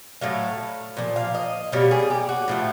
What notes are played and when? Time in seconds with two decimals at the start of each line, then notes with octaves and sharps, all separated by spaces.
0.21 A2 F#3 A3 F5
0.97 A#2 F3
1.16 F5
1.34 D#5
1.72 B2 G3 A#3 C#5
1.91 G#4
2.10 G4
2.29 F#4
2.48 A2 F3 A3